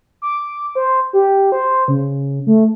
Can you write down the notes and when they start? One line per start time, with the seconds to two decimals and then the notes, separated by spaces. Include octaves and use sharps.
0.22 D6
0.75 C5
1.13 G4
1.52 C5
1.88 C#3
2.47 A3